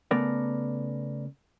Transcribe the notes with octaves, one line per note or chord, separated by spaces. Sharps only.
C#3 A3 B3 A#4 D5